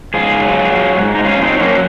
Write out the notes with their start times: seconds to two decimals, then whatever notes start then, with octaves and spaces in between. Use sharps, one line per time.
0.14 G#2 F4 G#4
0.42 F#3
0.69 F#3
0.97 G#2
1.14 D#4
1.24 F#3 C#4 F4
1.43 C4 D#4
1.52 F#3
1.61 A#3 C#4